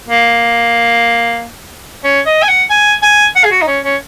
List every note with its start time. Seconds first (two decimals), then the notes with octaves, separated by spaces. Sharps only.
0.08 A#3
2.04 C#4
2.26 D#5
2.43 G#5
2.48 F#5
2.70 G#5
3.03 G#5
3.36 F#5
3.44 G#4
3.51 F#4
3.62 D#4
3.68 C#4
3.84 C#4